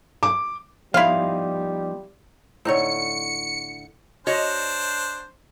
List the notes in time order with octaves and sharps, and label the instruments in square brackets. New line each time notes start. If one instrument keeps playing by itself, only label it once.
[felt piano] D6
[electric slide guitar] F3 B3 D#4 [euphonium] G3 [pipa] E4 F5
[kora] A2 D3 [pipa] C4 D#4 C#5 [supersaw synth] C#7
[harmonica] D4 C5 [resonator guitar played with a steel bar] F#4 C#5 D#5